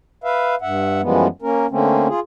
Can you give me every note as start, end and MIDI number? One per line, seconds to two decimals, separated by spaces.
0.24 0.55 71
0.24 0.55 76
0.24 0.55 77
0.62 1.01 43
0.62 1.01 76
0.62 1.01 78
1.01 1.27 42
1.01 1.27 52
1.01 1.27 53
1.01 1.27 55
1.01 1.27 56
1.01 1.27 59
1.42 1.67 58
1.42 1.67 61
1.42 1.67 70
1.70 2.08 50
1.70 2.08 57
1.70 2.08 58
1.70 2.08 60
1.70 2.08 61
2.08 2.20 65
2.08 2.20 68